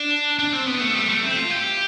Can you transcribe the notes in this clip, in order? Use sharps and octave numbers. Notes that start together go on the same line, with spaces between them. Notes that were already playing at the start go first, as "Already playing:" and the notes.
Already playing: D4
D4
C4
B3
A3
G3
A3
C4
F4
G4